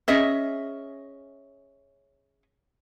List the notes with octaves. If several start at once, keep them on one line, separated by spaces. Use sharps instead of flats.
C#4 G#4 D#5 E5